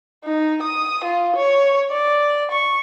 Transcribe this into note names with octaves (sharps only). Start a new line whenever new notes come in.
D#4
D#6
F4
C#5
D5
C#6